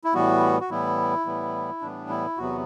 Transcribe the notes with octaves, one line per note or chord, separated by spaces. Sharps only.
E4
A2 E3 G3 B3 F#4
F#4
A2 E3 G3 B3 E4
A2 E3 G3 B3
A2 E3 G3 B3 D4
E4
E2 C3 F#3 B3 F#4